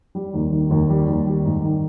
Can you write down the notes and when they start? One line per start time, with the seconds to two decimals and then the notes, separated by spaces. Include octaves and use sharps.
0.15 G3
0.34 D#2
0.52 D#3
0.71 D#2
0.89 G3
1.08 D#2
1.27 G3
1.45 G#2
1.64 D#3